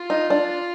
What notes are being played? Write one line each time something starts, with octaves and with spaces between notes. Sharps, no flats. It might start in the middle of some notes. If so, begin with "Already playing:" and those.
Already playing: F4
D#4
D4